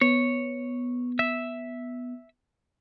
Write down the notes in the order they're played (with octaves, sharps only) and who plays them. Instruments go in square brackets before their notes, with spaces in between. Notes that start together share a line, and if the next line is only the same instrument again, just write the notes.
[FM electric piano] B3 [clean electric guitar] C#5
[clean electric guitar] E5